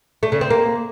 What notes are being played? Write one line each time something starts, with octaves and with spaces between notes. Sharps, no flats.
A3
C#3
C4
A#3